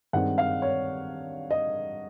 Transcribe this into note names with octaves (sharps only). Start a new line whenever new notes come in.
G2 D#3 G#3 C4 D#4 F#5
F5
C#5
D#5